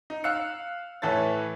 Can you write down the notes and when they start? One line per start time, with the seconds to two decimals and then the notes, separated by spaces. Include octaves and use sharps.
0.10 D#4
0.24 F5 E6 F#6 C#7
1.02 A2 E3 E4 A4 C#5 A6